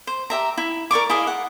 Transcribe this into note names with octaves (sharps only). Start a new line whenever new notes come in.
C5
G4 E5 A#5
E4
A#4 D5 C#6 D6
E4 G#4 D#5 F5
F#5